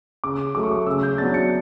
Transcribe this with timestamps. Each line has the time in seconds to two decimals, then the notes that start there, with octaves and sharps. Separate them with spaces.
0.24 C#3 D6
0.55 F#3 A3 D6
0.63 C#6
0.71 D6
0.86 C#3 E6
1.03 G6
1.18 F#3 B3 D4 A6
1.34 C#7